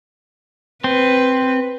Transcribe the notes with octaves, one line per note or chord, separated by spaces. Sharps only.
C4 B4